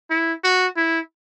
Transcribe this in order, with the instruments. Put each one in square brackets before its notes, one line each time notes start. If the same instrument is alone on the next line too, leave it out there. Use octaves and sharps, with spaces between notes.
[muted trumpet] E4
F#4
E4